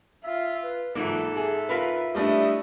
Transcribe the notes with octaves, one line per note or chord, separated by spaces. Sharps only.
F4 E5
B4
G#2 E3 F#3 A#3 F4 A4
G#4 E5
F4 A#4 B4
G3 A3 D4 E4 D#5